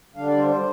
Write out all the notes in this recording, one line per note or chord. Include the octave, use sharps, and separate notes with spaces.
D3 G3 D4 F5
D5
C5
C5